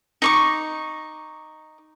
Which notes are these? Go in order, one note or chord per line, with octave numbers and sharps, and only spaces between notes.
D#4 C#6 D6